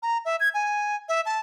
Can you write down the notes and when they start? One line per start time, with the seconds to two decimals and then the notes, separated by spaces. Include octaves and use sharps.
0.03 A#5
0.25 E5
0.40 G#6
0.54 G#5
1.09 E5
1.26 A5